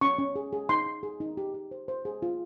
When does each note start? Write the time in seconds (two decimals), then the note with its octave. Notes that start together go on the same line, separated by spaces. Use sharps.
0.01 C#4 C#6
0.19 C#4
0.36 G#4
0.53 G#4
0.69 D#4 C6
0.86 D#4
1.03 G#4
1.20 D#4
1.37 G4
1.54 G4
1.71 C5
1.88 C5
2.05 G#4
2.22 F4